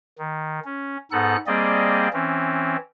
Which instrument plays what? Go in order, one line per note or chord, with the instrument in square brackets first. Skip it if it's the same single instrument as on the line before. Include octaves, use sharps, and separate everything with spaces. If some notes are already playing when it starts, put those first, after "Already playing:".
[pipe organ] D#3
C#4
G#2 B3 D#4 A4 F#5 F#6
G3 A#3 C4 G#4 D5 D#5
E3 C4 C#4